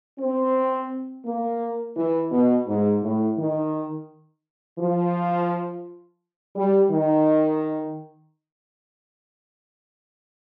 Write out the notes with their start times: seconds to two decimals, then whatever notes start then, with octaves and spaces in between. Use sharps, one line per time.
0.19 C4
1.25 A#3
1.96 E3
2.31 B2
2.67 G#2
3.03 A2
3.38 D#3
4.79 F3
6.56 G3
6.91 D#3